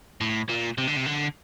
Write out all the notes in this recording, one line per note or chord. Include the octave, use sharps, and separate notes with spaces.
A2
A#2
C3
D3
C3
D3